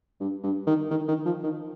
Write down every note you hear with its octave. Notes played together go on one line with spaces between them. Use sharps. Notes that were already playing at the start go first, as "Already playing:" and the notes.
G2
G2
D#3
D#3
D#3
F3
D#3